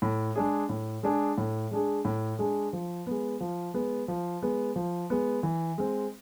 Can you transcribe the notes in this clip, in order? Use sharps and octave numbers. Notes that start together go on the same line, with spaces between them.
A2
G#3 D4 G#4
A2
G#3 D4 G#4
A2
G#3 D4 G#4
A2
G#3 D4 G#4
F3
G#3 B3
F3
G#3 B3
F3
G#3 B3
F3
G#3 B3
E3
G#3 C4